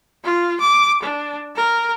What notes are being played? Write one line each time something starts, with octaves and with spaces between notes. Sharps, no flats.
F4
D6
D4
A#4